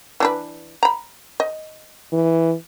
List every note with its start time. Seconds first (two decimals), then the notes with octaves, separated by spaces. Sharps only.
0.20 E3 D4 B4
0.83 A#5 B5
1.40 D#5
2.12 E3